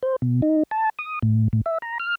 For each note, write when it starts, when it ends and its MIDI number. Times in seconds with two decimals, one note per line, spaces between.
0.03 0.16 72
0.22 0.41 47
0.42 0.63 63
0.71 0.90 81
0.99 1.19 87
1.22 1.48 45
1.53 1.61 45
1.66 1.78 76
1.82 1.98 82
2.00 2.15 89